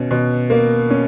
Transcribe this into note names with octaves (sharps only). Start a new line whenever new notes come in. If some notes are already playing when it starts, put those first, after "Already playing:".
Already playing: B2 C#4
B2
A#3
C#4